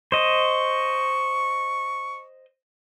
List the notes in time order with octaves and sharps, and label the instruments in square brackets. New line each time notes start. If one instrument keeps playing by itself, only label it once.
[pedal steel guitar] C5 D#5 [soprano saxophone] C#6